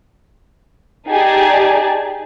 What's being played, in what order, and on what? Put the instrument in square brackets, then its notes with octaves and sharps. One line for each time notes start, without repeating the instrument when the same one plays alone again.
[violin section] D#4 G4 G#4 D5 G#5 A5